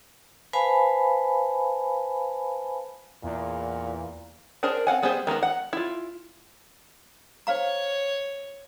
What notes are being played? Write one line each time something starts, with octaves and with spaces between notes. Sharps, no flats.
B4 C5 F5 G#5 A5 B5
E2 A#2
D4 G#4 A#4 C5
C4 F5 F#5 G#5
G3 B3 G4 G#4 C5
D#3 G#3 B3 A#4
F#5
E4 F4
C5 C#5 F5 A#5